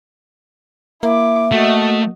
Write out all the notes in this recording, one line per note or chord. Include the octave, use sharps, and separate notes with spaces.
A#3 E4 E5 D6
A3 F#4 D#5